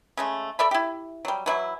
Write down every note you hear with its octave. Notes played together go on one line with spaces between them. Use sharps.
C#3 G#3 A3
A4 D5 E5 B5
E4 G4
F#3 G3
E3 F#3 E4